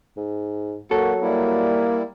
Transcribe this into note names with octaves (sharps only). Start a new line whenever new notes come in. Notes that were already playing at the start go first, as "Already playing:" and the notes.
G#2
F#3 A#3 F#4 A4
G3 A#3 E4